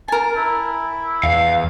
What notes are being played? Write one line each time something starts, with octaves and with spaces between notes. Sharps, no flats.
A#4 G#5 A5
E4
E2 F5